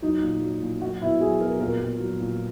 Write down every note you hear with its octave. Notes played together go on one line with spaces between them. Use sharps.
F#3 D#4
A#2
F#3
A#2
F#3 F#4
B2 E4
F#3 G#4
B2 A#4
A#2 A#4
A#2
F#3
A#2